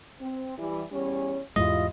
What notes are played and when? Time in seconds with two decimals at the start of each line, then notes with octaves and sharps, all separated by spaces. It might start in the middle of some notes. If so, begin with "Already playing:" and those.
0.20 C4
0.57 E3 G3
0.91 E2 G3 C#4
1.56 E2 G#2 G3 G#3 E4 F4 D#5